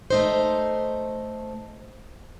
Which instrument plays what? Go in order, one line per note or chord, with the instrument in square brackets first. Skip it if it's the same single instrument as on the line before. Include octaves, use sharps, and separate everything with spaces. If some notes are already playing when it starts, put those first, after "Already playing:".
[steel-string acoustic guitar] A3 D#4 C5